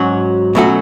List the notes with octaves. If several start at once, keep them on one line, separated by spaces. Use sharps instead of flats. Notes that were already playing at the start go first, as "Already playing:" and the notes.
Already playing: G#2 F#3 C#4 F#4
B2 F#3 A3 C#4 F#4